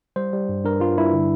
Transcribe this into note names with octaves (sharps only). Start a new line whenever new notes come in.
G3 C5
G3
G2
G2 A#4
G2 F4
G2 E4
D3